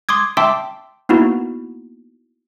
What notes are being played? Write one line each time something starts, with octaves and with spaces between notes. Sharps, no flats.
C6 D6 D#6 G#6
E5 G5 A5 C6 D6 E6
A#3 B3 D#4 E4 F#4